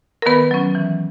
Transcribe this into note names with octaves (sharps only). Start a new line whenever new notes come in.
A#4
D#3 B3 B4
F#3 C#4
E3